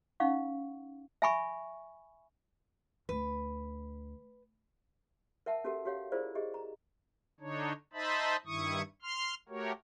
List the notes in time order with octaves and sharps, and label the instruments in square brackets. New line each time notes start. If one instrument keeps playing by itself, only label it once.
[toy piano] C#4 D#4 F5 F#5 C#6
E5 G#5 B5 C#6
[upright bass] D2 [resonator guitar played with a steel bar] B4
[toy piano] A#4 E5 F#5 A5
C#4 F#4 G4 A4 A#4 F#5
F#4 G4 C#5 F5 F#5
E4 F4 G#4 A#4 C5 D5
G4 G#4 D#5
A#5
[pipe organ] D3 D4 D#4 C#5
D#4 C5 D#5 E5 A5 B5
G2 D#3 E4 C#6 D#6
C6 F6
A3 F#4 G4 A#4 C#5